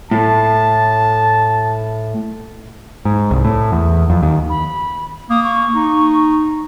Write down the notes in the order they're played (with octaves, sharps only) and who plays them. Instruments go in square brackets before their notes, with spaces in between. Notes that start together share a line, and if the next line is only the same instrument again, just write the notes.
[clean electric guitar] A2 [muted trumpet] A5
[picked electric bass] G#2
C2
A2
E2
F2
D#2
[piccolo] B5
[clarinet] A#3 [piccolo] D#6
[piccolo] C#6
[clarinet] D#4